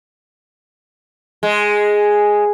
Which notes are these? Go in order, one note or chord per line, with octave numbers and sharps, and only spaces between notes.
G#3